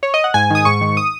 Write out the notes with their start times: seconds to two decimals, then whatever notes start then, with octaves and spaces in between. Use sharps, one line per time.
0.03 C#5
0.14 D#5
0.24 F#5
0.34 G#2 G#5
0.50 D#3 D#6
0.65 G#2 C#6
0.81 D#3
0.97 D#6